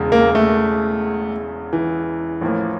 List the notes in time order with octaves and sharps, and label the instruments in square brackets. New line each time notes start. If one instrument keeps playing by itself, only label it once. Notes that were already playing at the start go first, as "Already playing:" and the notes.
Already playing: [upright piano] E1 E2 C#3
[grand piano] A#3
A3
E3
[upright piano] A1 A2 F3 A#3